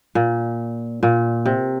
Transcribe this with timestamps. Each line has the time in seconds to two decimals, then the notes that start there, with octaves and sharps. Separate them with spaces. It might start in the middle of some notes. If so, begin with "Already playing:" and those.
0.15 A#2
1.03 A#2
1.46 C3